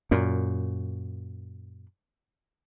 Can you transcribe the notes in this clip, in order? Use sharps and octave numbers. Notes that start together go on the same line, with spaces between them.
F#2 A#2